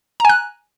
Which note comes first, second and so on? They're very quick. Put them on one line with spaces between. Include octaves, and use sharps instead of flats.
A#5 G#5 F#6